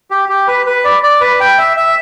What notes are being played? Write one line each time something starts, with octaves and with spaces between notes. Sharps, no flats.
G4
G4
B4
B4
D5
D5
B4
G5
E5
E5